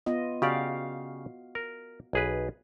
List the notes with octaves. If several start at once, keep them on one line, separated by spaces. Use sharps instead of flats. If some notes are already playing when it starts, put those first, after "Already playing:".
B3 F4 D#5
C#3 F#4 G4 D5 F5
A#4
B1 G#4 B4